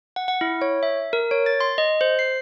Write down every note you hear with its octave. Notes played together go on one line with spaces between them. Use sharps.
F#5
F#5
E4
C#5
E5
A#4
C#5
A6
C6
D#5
C5
C7